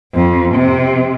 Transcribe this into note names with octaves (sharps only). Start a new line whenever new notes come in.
F2
C3